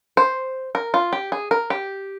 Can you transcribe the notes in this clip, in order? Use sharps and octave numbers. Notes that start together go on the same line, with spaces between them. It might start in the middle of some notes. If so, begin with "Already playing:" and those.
C5
A#4
F4
G4
G#4
A#4
G4